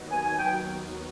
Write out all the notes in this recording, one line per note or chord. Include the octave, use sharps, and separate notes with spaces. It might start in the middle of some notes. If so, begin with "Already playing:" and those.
Already playing: D#2 D#3 F#3 B3 D#4
G#5
G#5
G5